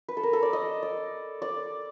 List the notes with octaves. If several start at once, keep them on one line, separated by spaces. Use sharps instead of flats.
B4
A4
A#4
A4
D5
D#5
D5
D5